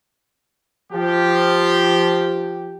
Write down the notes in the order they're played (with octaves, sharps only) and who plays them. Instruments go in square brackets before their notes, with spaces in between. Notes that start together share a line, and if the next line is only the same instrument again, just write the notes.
[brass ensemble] F3 G4